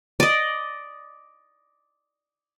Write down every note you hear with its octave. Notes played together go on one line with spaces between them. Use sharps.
D5 D#5